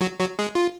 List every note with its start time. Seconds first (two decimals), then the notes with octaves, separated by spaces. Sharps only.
0.01 F#3 F#4
0.20 F#3 F#4
0.39 G#3 G#4
0.55 F4